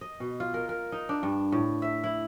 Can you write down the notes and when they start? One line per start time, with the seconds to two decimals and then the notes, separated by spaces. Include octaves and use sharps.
0.01 D#5
0.20 B2
0.40 F4
0.54 A#4
0.69 A#4
0.92 D#4
1.09 D4
1.23 G2
1.52 A2
1.82 E5
2.04 E4